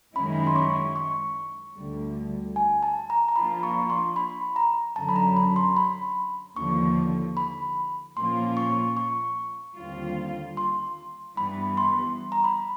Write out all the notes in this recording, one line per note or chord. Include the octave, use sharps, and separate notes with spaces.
F#2 D#3 G#3 C#4 E4 B5
C6
C#6
C#6
D2 D3 G3
G#5
A5
A#5
A#5
F3 A#3 D4 F4 B5
C#6
C6
B5
A#5
F#2 D3 F#3 A5
B5
A#5
B5
C6
B5
D#2 D3 F3 C#6
B5
A#2 F3 A#3 C#4 F4 C6
C#6
C#6
D#2 D3 G3 C4 F4
C6
G2 E3 G3 B3 B5
C6
A#5
B5